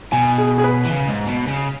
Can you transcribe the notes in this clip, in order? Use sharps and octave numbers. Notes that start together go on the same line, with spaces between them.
B2 G#5
G#4
G#4
B4
E3
C#3
G#2
B2
C#3